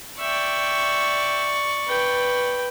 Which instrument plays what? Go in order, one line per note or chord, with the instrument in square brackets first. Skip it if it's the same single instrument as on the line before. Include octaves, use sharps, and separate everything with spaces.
[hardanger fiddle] D5 C#6 [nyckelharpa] E5 G5
[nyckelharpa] B4 G5